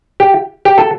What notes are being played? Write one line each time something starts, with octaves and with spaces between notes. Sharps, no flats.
G4
G4
A4